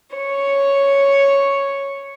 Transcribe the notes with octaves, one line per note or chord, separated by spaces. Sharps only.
C#5